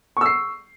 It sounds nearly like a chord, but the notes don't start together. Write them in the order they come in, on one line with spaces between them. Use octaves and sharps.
C#6 E6 C7